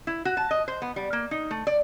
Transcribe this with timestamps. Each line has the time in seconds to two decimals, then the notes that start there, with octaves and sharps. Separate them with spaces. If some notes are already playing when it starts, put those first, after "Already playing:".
0.07 E4
0.25 F#4
0.37 A5
0.51 D#5
0.68 C5
0.82 B3
0.96 G3
1.13 A#3
1.31 D#4
1.51 A3
1.67 D5